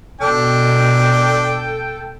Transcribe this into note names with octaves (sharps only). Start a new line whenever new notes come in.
B2 D4 A4 G5